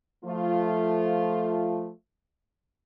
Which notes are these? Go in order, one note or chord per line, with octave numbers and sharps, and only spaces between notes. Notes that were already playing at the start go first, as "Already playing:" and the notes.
F3 A3 F4